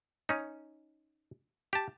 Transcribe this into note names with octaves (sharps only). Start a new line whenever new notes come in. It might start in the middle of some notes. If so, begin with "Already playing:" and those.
C#4 D#4
G4 A5